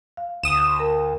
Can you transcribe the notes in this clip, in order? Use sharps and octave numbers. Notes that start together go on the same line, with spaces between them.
F5
D2 D#6 E7
A#4